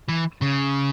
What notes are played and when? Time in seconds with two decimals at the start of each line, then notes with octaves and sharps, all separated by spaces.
0.08 E3
0.41 C#3